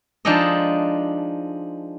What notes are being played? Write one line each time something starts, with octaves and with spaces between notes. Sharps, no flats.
F3 G#3 D4 D#4 A4 D#5